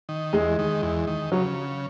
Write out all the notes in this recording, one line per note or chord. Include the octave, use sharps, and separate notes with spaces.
D#3
E2 G#3
D#3
E2
D#3
C#3 F#3